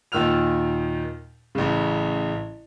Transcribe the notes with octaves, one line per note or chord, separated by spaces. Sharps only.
D#2 A#2 D#3 E6 F6 F7
A1 C#3